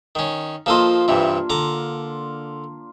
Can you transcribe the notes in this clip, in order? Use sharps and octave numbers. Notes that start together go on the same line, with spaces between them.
D#3 C#4
F3 A#3 F4 A4 D#5
G2 C3 E3 D4
D3 A#5 D6